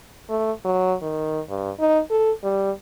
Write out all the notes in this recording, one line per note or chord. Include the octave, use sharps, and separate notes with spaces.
A3
F#3
D#3
G2
D#4
A4
G3